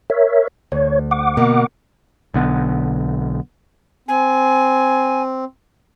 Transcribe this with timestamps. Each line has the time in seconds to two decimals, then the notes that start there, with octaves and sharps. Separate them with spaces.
0.10 A#4 C#5 E5
0.72 D2 C#5
1.11 F#5 D6
1.37 B2 A#3
2.34 B1 D3 B3
4.08 C4 G#5